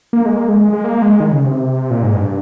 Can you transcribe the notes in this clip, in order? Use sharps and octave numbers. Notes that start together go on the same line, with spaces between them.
A#3
G#3
A#3
G#3
G#3
G#3
A#3
G#3
D#3
C#3
C3
A#2
G#2
G2